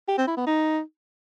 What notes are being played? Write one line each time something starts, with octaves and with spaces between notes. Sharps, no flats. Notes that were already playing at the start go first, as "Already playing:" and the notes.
G4
C4
E4
B3
D#4